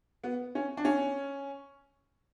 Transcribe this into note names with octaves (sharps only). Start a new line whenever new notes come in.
B3
C#4
D4
C#4